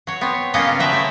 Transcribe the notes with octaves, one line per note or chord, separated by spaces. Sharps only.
F#3 C#5
B3 C4 C#5
F#3 A#3 B3 C#4 F4 D#5
C#3
F3 G#3 B4 E5 G5 A#5
A3 E4